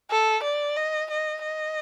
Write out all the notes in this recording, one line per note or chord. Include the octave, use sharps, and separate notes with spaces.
A4
D5
D#5
D#5
D#5